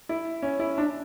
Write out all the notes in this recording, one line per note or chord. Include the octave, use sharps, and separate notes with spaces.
E4
C#4
E4
D4